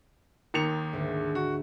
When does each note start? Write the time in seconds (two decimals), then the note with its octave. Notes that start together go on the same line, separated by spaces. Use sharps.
0.54 D#2 D#3 C#7 F7
0.93 D2 G#2
1.35 F#4